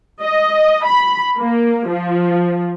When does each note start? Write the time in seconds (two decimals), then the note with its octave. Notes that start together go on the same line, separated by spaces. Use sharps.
0.21 D#5
0.84 B5
1.39 A#3
1.88 F3